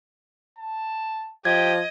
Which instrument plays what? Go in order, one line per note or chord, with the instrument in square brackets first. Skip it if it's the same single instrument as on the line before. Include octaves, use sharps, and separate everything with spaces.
[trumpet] A5
[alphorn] F3 [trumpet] G4 [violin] D#5 [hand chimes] G#6